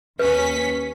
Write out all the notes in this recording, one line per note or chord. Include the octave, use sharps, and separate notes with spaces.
D#2 C#4 B4 B6